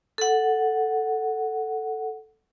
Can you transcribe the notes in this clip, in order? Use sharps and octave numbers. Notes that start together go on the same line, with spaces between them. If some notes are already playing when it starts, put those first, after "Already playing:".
A4 F#5